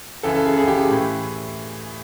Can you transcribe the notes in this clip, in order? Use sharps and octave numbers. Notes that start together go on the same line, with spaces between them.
F#2 C#3 E3 A4
A4
G#4
F#2 C#3 E3 G#4
G4
G#4
A2 E3